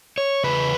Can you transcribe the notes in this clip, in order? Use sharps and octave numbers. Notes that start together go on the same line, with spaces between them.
C#5
E2 C#3 B4